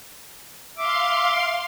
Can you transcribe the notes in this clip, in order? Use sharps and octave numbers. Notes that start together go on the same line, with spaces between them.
E5 F5 C6 D6